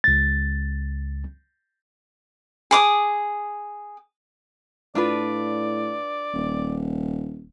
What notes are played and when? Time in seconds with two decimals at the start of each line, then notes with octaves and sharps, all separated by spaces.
0.04 C#2 A6
2.71 G#4 D6 D#6
4.95 A2 D4 F4 B4 D5
6.34 D#1